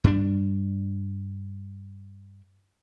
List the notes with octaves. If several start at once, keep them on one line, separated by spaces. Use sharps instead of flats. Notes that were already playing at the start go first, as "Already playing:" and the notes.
G2 G3 D4